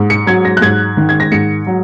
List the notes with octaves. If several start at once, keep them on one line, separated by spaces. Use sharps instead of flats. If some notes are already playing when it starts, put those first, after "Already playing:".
Already playing: G#2
C#7
F#3 G#6
A#6
F#6
G#2 G#6
D#3
G#6
A#6
G#2 C#7
F#3